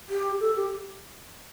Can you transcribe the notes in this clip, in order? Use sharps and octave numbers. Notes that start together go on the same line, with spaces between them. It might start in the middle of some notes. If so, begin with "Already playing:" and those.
G4
A4
G4